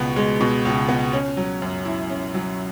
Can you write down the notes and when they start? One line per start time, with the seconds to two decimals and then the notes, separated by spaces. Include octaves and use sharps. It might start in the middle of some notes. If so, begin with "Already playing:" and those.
Already playing: C#2 B2 G#3 B3
0.16 G#3
0.41 B2
0.65 C#2
0.89 B3
1.13 C#4
1.37 F#3
1.62 F#2
1.85 E4
2.10 C#4
2.34 F#3